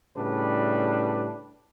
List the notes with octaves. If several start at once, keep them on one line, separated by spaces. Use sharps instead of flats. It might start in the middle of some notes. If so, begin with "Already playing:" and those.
A2 C#3 G3 D4 B4